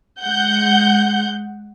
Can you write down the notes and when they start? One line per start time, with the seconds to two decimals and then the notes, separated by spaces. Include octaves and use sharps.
0.22 G#3 F#5 G6